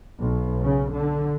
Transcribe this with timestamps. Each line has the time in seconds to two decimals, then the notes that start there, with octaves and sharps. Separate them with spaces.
0.20 B1
0.63 C#3
0.94 D3